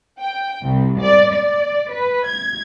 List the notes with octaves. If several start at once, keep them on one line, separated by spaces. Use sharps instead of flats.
G5
C2
D5
D5
B4
G#6